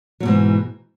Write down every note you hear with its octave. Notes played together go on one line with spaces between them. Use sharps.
G#2 B2 E3 F#3